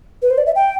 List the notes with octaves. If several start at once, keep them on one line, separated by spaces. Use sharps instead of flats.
B4
C5
D5
E5
G5